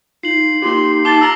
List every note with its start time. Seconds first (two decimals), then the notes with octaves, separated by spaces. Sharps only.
0.23 D#4 F4 C7 F#7
0.62 A#3 D#4 F4 G4 C6
1.05 A5 D6 G7
1.21 A#5 E6 A#6 F#7